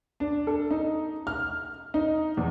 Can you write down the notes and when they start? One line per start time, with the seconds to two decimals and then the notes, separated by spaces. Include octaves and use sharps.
0.20 D4
0.47 A4
0.71 D#4
1.27 F6
1.94 D#4
2.37 E2